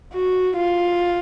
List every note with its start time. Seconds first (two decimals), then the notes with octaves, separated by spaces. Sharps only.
0.14 F#4
0.58 F4